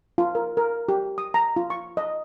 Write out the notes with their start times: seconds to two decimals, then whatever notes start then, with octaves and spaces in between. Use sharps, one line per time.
0.18 F4
0.35 A#4
0.57 A#4
0.89 G4
1.18 D#6
1.34 A#5
1.56 F4
1.70 C#6
1.97 D#5